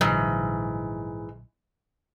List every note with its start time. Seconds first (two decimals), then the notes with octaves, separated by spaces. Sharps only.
0.01 A#1 G#2 D3 E3 F#3